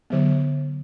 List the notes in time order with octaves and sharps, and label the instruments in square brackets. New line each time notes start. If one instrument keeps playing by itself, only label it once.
[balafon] D3 F#3 B3